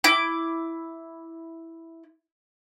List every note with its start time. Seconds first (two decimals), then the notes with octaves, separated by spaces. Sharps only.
0.04 E4 D6